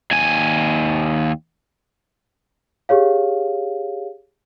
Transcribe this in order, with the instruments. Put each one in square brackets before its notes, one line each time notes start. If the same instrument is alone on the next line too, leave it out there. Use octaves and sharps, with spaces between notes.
[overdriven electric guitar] D#2 G#5
[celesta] G4 G#4 C#5 F5